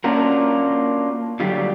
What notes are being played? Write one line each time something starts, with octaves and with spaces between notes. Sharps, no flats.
A#3 C#4 D4 F4 F#4 A#4
D3 F#3 G3 F4 G4